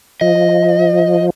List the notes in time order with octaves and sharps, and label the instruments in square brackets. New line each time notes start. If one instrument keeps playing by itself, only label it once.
[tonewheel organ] F3 [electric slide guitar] D#5